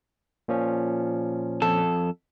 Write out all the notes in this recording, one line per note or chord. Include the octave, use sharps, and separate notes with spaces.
A#2 F3 C#4
F2 A4